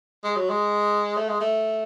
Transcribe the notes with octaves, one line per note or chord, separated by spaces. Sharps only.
G#3
F#3
G#3
A3
G#3
A3